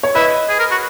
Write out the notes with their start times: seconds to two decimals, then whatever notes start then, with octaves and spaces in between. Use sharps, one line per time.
0.03 C#5
0.15 E4 B4 D#5
0.49 G#4
0.59 A#4
0.71 F#4